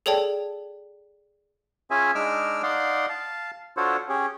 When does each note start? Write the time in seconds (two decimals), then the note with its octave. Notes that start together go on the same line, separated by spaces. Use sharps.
0.06 G#4 A4 C#5 D5 G5 A5
1.91 C#4 F4 G#4 E5 G#5
2.15 G#3 D4 D#4 D6 E6 F6
2.63 D#4 D5 F5 F#5 C6
3.09 F5 A5
3.77 D4 F4 F#4 A4 C5 C#5
4.09 C#4 G4 G#4